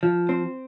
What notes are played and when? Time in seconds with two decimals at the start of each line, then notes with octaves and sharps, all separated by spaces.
0.03 F3
0.29 C4